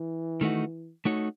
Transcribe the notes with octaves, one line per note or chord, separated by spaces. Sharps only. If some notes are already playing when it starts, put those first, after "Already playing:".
Already playing: E3
D#3 A3 D#4 F#4
A3 D#4 F#4 C#5